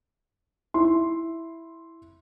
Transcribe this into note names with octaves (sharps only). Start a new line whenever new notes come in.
E4 C6